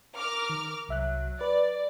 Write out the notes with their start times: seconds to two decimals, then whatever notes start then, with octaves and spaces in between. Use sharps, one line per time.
0.17 A#4 D6 F6
0.50 D#3
0.89 C2 F#3 E5 F#6
1.41 B4 D5